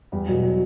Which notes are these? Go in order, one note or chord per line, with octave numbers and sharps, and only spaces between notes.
E2 G3
B2 F#3
F#3